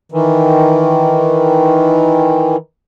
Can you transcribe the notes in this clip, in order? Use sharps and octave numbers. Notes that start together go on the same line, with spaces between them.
D#3 E3